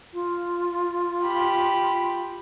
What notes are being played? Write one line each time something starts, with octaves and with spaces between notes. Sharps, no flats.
F4
G4 B5